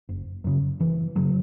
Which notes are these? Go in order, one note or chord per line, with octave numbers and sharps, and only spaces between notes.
F#1
F#2 C#3
F#1 E3
F#2 C#3 F#3